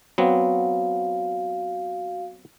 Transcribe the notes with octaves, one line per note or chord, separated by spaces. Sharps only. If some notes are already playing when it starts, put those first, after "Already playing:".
F#3 B3 C4 F#4 F5